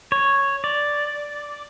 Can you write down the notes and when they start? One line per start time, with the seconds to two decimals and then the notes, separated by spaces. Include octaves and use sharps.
0.12 C#5
0.64 D5